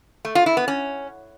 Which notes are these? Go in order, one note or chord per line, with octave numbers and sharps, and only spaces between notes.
A3
F4
E4
B3
C#4